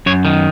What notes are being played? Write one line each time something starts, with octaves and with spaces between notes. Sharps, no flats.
F#2 C#5
D#3